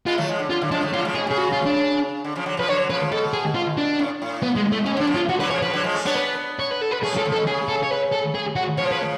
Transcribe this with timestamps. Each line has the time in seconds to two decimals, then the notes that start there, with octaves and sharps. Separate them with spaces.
0.07 G#3 B3 F4
0.18 F#3 A3
0.28 F3 G#3
0.39 D3
0.50 D3 F4
0.62 D3 F#3
0.71 F3 G#3 D4
0.83 F#3 A3
0.93 D3 F#3 F4
1.05 C#3 F3
1.15 B2 G#4
1.27 C#3 G#4
1.38 F#4
1.52 F4
1.66 D4
2.25 D3
2.35 C#3 F3
2.46 D3 F#3
2.57 C#3 F3 B4
2.67 D3 F#3 C#5
2.89 C#3 F3 B4
3.12 B2 A4
3.33 G#4
3.55 F4
3.77 D4
3.99 A2
4.22 A2
4.42 B3
4.56 G#3
4.72 A3
4.86 B2 C#4
4.97 D3 D4
5.07 C#3 F3
5.15 F4
5.29 D3 F#4
5.40 D3 F#3 B4
5.51 C#3 F3 C#5
5.62 C#3 F3 B4
5.73 D3 F#3
5.84 F3 G#3
5.94 A3 C#4
6.05 B3 D4 C#5
6.16 B4
6.60 C#5
6.71 B4
6.82 A4
6.92 B4
7.03 A3 C#4 G#4
7.14 C#3 F3
7.18 A4
7.25 C#3 F3
7.33 A4
7.36 B2
7.47 C#3 G#4
7.68 A4
7.83 C#5
7.91 B4
8.12 A4
8.35 G#4
8.56 F#4
8.77 C#3 F3 C#5
8.92 B4